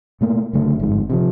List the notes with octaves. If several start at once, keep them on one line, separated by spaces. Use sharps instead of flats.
B2 A3 A#3
F#1 D3 A3
G1 F2 G#2
C3 E3 F3